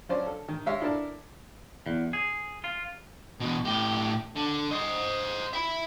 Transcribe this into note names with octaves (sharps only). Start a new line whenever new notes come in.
F3 F#3 C#4 F4 C5 D5
A4
D#3
G#3 G4 C#5 E5 F5
D4 E4 A4 A#4 D5 A5
E2
G#4
F4
E2 B2
A2 G4
D3
C5 D#5
E5 B5